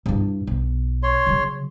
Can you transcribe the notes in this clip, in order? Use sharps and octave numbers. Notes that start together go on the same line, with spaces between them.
G2 E4
B1
C#5 C6
C#3 F#3